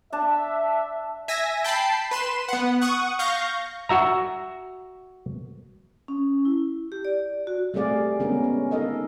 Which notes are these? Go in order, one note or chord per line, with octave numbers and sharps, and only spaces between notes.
D4 E5 A5
E5 G#5 A#6
G5 A5 B5 C7
B4 C6 E7
B3 F#5
F#5 C#6 D#6
F5 C#6 G6 A#6
F#4 E5 A#5
C#4
E4
G4
D5
F#4
G3 A3 C4 G#4 D5 F5
D3 G#3 B3 C#4 G#4 A#4
C#4
D#4 A4 A#4 D#5 F5